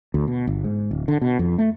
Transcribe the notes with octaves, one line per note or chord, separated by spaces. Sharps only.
D2
B2
G1
G#2
D1
D3
B2
F2
A3